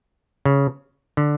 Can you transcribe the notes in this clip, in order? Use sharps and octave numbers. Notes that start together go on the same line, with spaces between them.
C#3
D3